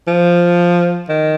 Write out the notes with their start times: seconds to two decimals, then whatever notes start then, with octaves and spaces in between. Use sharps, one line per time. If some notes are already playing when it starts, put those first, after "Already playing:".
0.08 F3
1.09 D#3